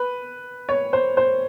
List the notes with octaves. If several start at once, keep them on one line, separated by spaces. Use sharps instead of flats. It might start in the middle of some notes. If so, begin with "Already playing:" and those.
Already playing: B4
C#5
C5
C5